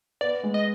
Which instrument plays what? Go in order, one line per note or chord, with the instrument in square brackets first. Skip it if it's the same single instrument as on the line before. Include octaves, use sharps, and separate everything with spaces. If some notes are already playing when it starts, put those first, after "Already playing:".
[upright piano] B3 [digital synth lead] D5
[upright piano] G#3
[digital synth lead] D#5